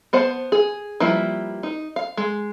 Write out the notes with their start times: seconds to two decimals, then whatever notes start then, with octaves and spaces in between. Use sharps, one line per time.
0.13 B3 C5 F#5 A5
0.52 G#4
1.00 F3 G3 A#3 E4 B4
1.63 D#4
1.96 F5
2.17 G#3